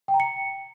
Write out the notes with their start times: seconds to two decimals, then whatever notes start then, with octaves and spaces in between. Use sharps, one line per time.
0.08 G5
0.14 A#5
0.20 C#7